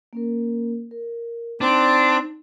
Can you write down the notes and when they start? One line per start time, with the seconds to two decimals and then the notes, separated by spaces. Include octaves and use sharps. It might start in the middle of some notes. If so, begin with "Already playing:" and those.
0.13 A#3 C#4 A#4
0.91 A#4
1.61 C4 D4 D#4 D6